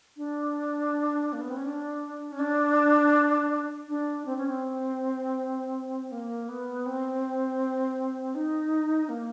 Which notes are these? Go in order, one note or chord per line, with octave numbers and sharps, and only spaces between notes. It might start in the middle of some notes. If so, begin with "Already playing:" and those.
D4
A#3
B3
C4
C#4
D4
C#4
D4
D4
C4
C#4
C4
A#3
B3
C4
D#4
A#3